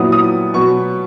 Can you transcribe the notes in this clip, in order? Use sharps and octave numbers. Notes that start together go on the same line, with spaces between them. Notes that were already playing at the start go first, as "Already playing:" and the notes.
Already playing: A#2 F#3 B3 E4 D#6
D#6
B2 F#3 B3 C#6